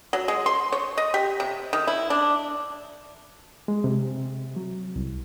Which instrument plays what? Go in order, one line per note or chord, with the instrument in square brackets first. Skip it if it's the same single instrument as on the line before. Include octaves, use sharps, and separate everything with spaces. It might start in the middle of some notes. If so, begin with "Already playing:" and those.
[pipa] F#3
G#3
C6
C#5
D#5
G4
C3
D#3
E4
D4
[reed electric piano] G#3
C3
F#3
C2